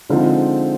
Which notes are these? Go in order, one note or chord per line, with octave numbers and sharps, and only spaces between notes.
D3 F3 G#3 C4 D#4